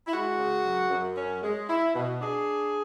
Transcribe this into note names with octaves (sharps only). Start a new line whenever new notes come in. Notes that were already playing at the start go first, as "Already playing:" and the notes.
E4
G#3 F#4
C#3
F#2
F#2
C#4
G#3
E4
B2
D4 G#4